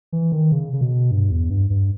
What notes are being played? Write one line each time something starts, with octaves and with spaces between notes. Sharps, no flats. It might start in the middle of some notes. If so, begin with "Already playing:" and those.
E3
D#3
C#3
C#3
B2
G2
E2
G2
G2